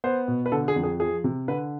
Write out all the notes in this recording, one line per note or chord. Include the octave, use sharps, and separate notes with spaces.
B3 C5
B2
B4
D3 A4
G#4
F2
G#4
F3 G#4
C3
D3 B4